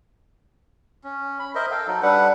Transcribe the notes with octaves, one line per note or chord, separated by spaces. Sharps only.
C#4
B5
A#4 C5 D#5 E5
A4 F5 G5
F#3 D#4 A4
G3 D4 B4 F#5